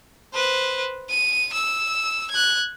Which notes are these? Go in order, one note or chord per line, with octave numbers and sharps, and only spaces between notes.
B4 C5
D#7
E6
F#6 G#6